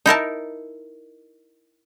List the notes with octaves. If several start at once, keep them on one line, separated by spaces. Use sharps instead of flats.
D#4 E4 A#4 A5